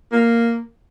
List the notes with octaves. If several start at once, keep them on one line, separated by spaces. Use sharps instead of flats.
A#3